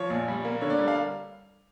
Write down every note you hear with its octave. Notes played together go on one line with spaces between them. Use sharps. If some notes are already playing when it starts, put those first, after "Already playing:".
Already playing: F3 C#5
A#1
G3
A#3
D3 C#5
D5
G3
F5